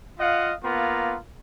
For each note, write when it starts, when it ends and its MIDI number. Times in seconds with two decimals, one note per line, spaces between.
0.20 0.54 65
0.20 0.54 75
0.20 0.54 77
0.20 0.54 78
0.64 1.16 58
0.64 1.16 59
0.64 1.16 65
0.64 1.16 82